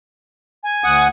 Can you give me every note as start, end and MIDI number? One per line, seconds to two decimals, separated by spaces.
0.63 1.07 80
0.84 1.08 38
0.84 1.08 78
0.84 1.08 87